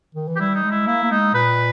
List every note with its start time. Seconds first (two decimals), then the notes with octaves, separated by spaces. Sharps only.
0.15 D#3
0.28 E3
0.36 G4
0.40 G3 E4
0.55 D#4
0.64 G#3
0.71 E4
0.87 A#3 E4
1.03 A#3
1.11 G#3 D#4
1.34 A#2 B4